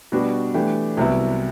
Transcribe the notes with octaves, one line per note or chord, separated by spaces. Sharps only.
B2 G3 B3 D4 F#4
E3 A3 D4 G4
C2 C3 F#3 B3 E4